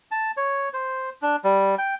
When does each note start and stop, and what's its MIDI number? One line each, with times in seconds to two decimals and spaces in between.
0.11 0.31 81
0.37 0.69 73
0.73 1.10 72
1.22 1.36 62
1.44 1.75 55
1.78 1.95 79